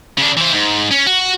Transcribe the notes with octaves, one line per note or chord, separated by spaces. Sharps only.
C#3 D4
E3 C5
G#2
C#4
F#4